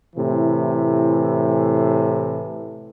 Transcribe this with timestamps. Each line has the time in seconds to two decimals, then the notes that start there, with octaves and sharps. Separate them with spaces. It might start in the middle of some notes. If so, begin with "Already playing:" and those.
0.16 A2 C3 E3